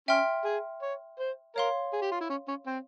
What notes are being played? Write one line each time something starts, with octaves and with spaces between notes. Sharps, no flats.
C#4 E5 G5 C6 F6
G#4
C#5
C5
A#4 C#5 F5 C6
G#4
G4
F4
E4
C#4
C#4
C4